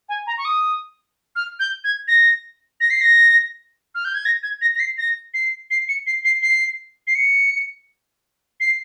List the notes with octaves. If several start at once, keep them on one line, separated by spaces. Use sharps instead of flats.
G#5
A#5
C#6
D#6
F6
G6
G#6
A#6
A#6
C7
A#6
F6
G6
G#6
A#6
G#6
A#6
A#6
C7
A#6
C7
C7
C#7
C7
C7
C7
C7
C#7
C7